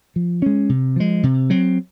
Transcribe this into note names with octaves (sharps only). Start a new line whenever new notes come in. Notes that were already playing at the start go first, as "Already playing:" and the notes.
F3
G#3 C#4
C3
F3 G#3
C3
F#3 C4